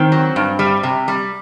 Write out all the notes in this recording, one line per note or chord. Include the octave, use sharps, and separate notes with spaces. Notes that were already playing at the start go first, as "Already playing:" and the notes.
Already playing: D#3 C4
F#3
G2
G3
C3
G3